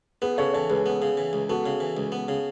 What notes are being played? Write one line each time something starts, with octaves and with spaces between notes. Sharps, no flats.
B3 G#4 B4
C#3 A4 C#5
E3 A4 C#5
C#2 G#4 B4
B3
C#3
E3
C#2
B3 F#4 A4
C#3
E3
C#2
B3
C#3